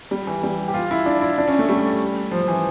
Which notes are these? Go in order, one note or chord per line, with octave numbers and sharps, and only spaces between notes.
G3
E3
G3
G4
F4
E4
D4
E4
D4
C#4
A3
G3
F3
F3
E3